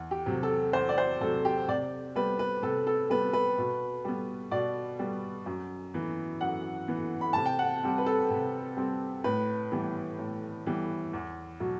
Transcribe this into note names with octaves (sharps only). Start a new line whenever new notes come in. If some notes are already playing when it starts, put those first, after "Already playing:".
Already playing: E2
G4
C3 F#3
A4
E2 C5
D5
C5
C3 F#3 A4
G4
C3 D5
G3 B3 B4
B4
C3 A4
A4
G3 B3 B4
B4
B2
G3 B3
B2 D5
G3 B3
F#2
E3 B3
F#2 F#5
E3 B3
B5
C3 A5
G5
F#5
G3 C4
B4
A4
C3
G3 C4
A2 B4
E3 G3 B3
A2
E3 G3 B3
E2
B2 F#3